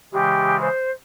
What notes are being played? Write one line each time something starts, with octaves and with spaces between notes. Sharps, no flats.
C#3 E3 G#3 G4
C5